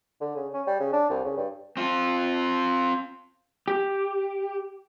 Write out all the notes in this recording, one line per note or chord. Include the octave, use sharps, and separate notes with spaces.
D3
C#3
C#4
G3
C#3
D4
C2
C#3
G2
C4 F4
G4